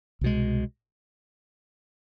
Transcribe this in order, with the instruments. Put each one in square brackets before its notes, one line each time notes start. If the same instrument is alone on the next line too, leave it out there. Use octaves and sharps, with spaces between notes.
[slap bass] C2 B2 G#3